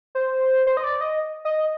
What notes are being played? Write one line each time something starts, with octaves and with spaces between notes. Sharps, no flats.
C5
C5
D#5
D5
D#5
D#5